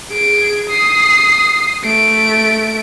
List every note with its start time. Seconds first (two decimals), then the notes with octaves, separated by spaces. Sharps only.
0.11 G#4 D7
0.69 D#6 C7
1.85 A3 D7